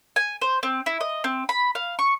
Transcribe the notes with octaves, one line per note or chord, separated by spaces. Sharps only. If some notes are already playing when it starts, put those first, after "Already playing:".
G#5
C5
C4
E4
D#5
C4
B5
F5
C#6